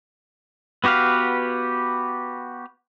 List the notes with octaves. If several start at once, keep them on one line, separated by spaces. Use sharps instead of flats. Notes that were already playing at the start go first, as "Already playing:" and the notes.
B3 F#4 G4 B4 F5